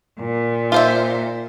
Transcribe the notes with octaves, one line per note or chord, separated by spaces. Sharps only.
A#2
F4 C5 E5